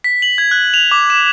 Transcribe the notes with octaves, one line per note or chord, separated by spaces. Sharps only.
B6
F#7
G#6
F#6
F7
D6
E7